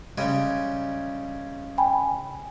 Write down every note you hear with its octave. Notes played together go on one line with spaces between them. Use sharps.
C#3 G3 G#3
G5 G#5 B5